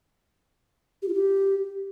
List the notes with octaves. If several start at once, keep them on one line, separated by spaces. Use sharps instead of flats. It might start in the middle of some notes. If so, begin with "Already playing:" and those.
G4
F4
G4